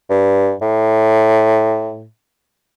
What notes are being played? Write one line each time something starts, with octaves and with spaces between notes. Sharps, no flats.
G2
A2